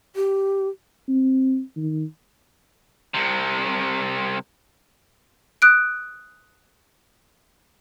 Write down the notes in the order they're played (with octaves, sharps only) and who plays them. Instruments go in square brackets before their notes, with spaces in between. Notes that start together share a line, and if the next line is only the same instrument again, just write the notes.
[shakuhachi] G4
[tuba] C4
D#3
[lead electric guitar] C2 C3
[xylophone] D#6 F#6 D7